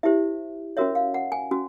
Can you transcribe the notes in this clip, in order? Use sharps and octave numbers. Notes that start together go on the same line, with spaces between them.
E4 G4 C5 E5
C#4 F#4 A#4 C#5 E5
F5
F#5
G#5
C#4 F#4